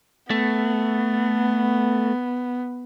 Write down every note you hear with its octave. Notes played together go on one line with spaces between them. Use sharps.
A3 B3